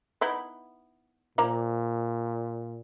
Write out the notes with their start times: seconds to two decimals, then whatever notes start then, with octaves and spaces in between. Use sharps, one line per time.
0.21 B3 D#4 E4
1.38 A#2 F3 A#3 A#5